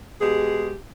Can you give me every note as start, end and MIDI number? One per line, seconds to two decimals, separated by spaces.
0.21 0.73 47
0.21 0.73 56
0.21 0.73 67
0.21 0.73 68